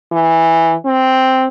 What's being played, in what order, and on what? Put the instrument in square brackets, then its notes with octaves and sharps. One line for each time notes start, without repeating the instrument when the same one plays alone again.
[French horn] E3
C4